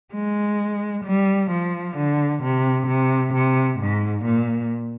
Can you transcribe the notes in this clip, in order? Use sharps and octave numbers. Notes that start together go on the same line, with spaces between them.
G#3
G3
F3
D3
C3
C3
C3
G#2
A#2